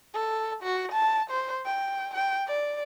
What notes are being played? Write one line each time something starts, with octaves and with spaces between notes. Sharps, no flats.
A4
F#4
A5
C5
G5
G5
D5